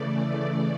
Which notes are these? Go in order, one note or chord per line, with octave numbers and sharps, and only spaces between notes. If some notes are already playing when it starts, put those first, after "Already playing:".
Already playing: C#3 E3 A3 D5
D5